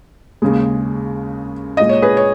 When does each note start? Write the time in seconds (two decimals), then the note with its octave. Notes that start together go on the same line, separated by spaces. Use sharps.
0.42 D#2 C#3 G#3
1.77 A#2 G#3 D#5
1.89 C#5
2.02 G#4 B4
2.17 C#5